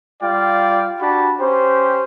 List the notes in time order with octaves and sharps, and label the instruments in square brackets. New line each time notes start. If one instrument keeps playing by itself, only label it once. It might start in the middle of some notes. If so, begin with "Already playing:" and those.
[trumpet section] G3 F4 D5 F5 G5
D4 F#4 G4 A5 B5
C#4 G4 C5